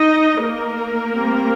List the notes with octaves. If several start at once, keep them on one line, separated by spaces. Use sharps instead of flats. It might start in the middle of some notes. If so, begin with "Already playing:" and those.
Already playing: D#4 D#5
A#3 A#4
G3 C4